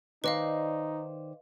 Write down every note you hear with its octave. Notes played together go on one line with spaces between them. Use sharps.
D#3 D#4 B4 C5 D5 D#5 F5